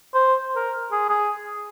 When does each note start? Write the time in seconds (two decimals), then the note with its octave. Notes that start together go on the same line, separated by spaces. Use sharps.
0.14 C5
0.56 A#4
0.92 G#4
1.09 G#4